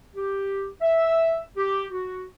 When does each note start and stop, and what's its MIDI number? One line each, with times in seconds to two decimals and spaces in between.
0.16 0.66 67
0.81 1.37 76
1.56 1.85 67
1.91 2.24 66